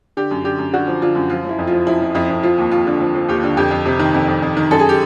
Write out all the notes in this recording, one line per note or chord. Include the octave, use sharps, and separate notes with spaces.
D3 G4
F#2
D3 G4
F#2
D3 F#4
F3
D3 F4
F#2
F3 F4
F3 E4
F2
F3 F4
F3 E4
F3
F2 E4
F2
F3 F4
D#2
D#2 F4
D3
F3
F3
D#2 G4
D3
F2 G4
F2
C3
D#3
F2
F2
F2
D#3
F#2 A4
G#4
G4